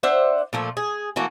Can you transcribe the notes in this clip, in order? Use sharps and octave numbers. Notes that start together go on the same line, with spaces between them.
D4 C5 E5 F#5
A#2 F3 A3
G#4
E3 A3 A#3 F#4